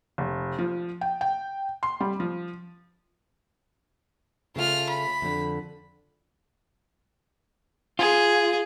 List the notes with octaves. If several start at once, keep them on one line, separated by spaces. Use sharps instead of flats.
F1
F3
G5
G5
C6
G3
F3
C#3 A3 C#4 F4 F6
B5
F2 D3
F4 G#4